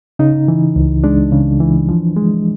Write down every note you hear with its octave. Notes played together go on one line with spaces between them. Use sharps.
C#3 D#4
E3
C#2
G#3 D4
C#3
E3
F3
G#3